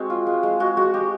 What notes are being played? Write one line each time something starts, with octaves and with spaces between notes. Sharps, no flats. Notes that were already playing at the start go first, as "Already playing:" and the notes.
Already playing: G#3 C4 F#4
F4
G#3
G#3
G#3 F#4
G#3 F#4
G#3 G4